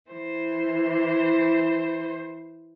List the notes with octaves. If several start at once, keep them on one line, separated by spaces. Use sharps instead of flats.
E3 C5